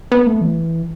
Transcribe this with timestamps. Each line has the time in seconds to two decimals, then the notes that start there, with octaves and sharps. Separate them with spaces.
0.12 B3
0.27 A3
0.41 E3